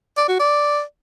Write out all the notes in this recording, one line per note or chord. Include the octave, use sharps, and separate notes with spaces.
D5
F#4
D5